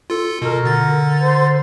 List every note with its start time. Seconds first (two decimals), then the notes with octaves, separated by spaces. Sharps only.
0.10 F4 A4
0.42 B2 A#4
0.65 D3 A6
1.21 C5